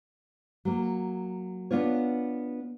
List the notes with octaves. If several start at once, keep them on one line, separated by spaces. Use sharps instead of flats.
F#3 A#3
B3 D4 F4 C#5